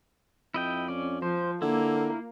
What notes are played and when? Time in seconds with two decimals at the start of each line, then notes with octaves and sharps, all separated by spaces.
0.54 F2 E4 D#5 G5
0.88 C#4 D5
1.22 F3 C5
1.62 D3 A#3 E4